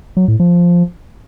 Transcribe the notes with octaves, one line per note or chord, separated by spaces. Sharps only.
F#3
A2
F3